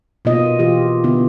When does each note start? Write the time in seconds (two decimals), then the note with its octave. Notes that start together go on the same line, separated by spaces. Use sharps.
0.25 B2 A#3 F4 D#5
0.59 E3 F4 G4
1.04 D3 B3 E4